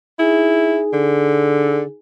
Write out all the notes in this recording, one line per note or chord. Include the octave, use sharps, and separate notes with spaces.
D#4 E4 G#4 G#5
D3